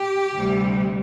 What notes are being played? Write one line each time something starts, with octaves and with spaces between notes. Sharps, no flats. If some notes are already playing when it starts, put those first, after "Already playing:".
Already playing: G4
D2 C3 G3